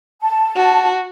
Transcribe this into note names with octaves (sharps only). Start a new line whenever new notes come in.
A5
F#4